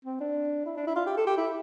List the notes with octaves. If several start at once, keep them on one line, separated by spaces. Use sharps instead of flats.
C4
D4
E4
D4
E4
F4
G4
A4
G4
E4